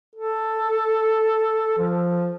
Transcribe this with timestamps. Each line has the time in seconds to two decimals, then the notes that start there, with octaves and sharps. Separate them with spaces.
0.15 A4
1.78 F3